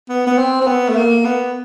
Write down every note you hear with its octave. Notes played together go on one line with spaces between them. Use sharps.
B3
B3
C4
C4
B3
A3
A#3
B3